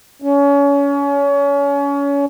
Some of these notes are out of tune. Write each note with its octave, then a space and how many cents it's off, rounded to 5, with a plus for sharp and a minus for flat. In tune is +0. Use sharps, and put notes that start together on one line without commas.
C#4 +30